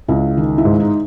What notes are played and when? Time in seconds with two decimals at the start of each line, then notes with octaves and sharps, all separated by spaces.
0.08 C#2 E4
0.37 D#3
0.58 E4
0.65 G#2
0.80 D#4